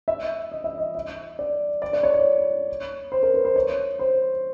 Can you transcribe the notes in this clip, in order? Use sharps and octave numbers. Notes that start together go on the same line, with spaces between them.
E5
D#5
E5
D#5
E5
D5
D5
D5
C#5
C#5
C5
A#4
B4
C5
C#5
C5